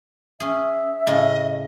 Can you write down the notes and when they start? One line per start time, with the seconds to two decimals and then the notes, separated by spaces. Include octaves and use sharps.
0.40 C#4 G#4 E5
1.07 A2 C#3 C#4 D#5